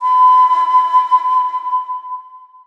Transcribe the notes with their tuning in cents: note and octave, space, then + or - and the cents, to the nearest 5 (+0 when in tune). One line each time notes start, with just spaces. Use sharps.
B5 +45